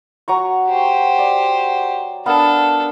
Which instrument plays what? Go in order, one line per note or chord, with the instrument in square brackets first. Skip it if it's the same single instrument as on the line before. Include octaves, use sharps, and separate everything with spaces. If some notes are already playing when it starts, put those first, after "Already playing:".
[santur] F#3 A#5 C#6
[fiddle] G4 C5
[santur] D5
[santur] B3 A#4 F5 [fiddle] D4 A4